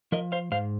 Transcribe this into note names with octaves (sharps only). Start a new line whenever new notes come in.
F3 A#4 D#5
C5 F5
G#2 C5 F5